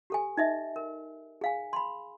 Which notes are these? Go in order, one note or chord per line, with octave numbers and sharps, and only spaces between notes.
G4 A4 G#5
D#4 D#5 E5
A#4
G#4 F5 G#5
B5 C6